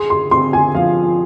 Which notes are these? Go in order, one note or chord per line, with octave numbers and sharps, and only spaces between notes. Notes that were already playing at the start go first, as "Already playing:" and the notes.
Already playing: G#4 C6
C6
C4 C6
G#5
F3 F5